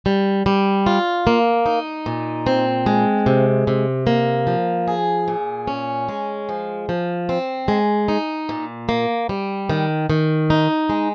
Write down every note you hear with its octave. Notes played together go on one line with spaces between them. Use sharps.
G3
G3
F4
A#3
D#4
A#2
C4
G#3
C3
C3
A#3
F3
G#4
A#2
C#4
G#3
F3
F3
C4
G#3
D#4
A#2
A#3
G3
D#3
D#3
D#4
G#3